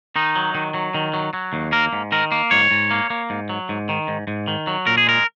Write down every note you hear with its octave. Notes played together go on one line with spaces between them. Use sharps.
D#3 D#4
F#3
D#3
F#3
D#3
F#3
F#3
D#2
A#3 A#4
G#2
D#3 A#4
A#3
G#2 C#5
G#2
A#3
A#3
G#2
F#3
G#2
D#3
G#2
G#2
D#3
F#3
A#2 A#4
G#4
G#3 A#4